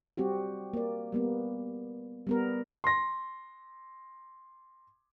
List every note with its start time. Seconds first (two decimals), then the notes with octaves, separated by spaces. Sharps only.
0.17 G3 C4 F#4 G4
0.73 A#3 D5
1.12 G3 A#3 B3
2.27 G3 B3 A#4
2.84 C6 A#6